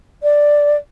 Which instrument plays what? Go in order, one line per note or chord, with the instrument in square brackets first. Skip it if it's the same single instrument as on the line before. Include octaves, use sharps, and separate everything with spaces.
[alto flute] D5